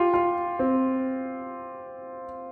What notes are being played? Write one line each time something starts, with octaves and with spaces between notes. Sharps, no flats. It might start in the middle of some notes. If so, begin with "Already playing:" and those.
Already playing: F4 G4
F4
C4